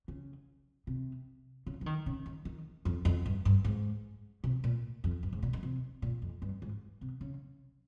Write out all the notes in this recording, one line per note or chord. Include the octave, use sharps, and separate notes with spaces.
C#3
C3
C#3
F3
D#3
C#3
D#3
D#3
F2
F2
G2
G2
G#2
C3
A#2
F2
G2
G#2
A#2
D#3
C3
A#2
F2
G2
G#2
C3
C#3